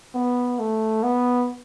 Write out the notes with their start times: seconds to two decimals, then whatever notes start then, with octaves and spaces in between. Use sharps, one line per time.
0.14 B3
0.59 A3
1.03 B3